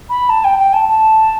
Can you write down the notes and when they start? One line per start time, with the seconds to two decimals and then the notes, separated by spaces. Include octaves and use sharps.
0.09 B5
0.29 A5
0.44 G5
0.58 G5
0.73 A5
0.88 A5